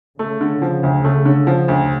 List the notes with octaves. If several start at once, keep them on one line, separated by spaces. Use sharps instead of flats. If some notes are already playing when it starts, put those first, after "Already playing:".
C#3 A3
D3
F3
D2
A3
D3
F3
D2